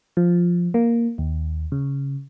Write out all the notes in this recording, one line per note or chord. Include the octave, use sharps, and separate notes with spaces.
F3
A#3
D#2
C#3